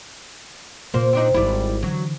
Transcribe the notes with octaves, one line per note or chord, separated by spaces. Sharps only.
A#2 A#3 C5
C4 D4 D#4
G#1 G3 D#4 E4
D3 E3 F#3